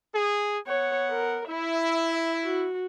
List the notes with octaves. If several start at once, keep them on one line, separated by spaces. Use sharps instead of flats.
G#4
B3 C#5 F#5
A#4
E4 E5
F#4